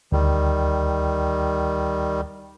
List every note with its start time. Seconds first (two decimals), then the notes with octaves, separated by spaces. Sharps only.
0.12 D2 D#3 G3